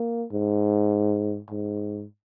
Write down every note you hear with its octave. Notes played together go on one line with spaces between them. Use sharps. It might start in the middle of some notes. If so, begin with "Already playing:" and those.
Already playing: A#3
G#2
G#2